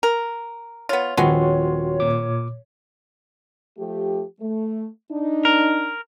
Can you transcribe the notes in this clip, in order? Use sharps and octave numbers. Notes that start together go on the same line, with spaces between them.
A#4
B3 F4 C#5
D#1 F3 G#3 B3 C4 F#4 C6
A#2 D6
F3 A3 G4
A3
D4 D#4
A#4